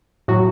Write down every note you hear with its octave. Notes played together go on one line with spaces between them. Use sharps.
A2 F#3 F#4